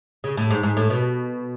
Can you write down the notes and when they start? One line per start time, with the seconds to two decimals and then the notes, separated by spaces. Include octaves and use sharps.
0.24 C#3
0.37 A2
0.50 G#2
0.63 G#2
0.77 A2
0.90 B2